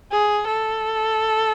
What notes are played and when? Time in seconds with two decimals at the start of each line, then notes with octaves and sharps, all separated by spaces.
0.11 G#4
0.47 A4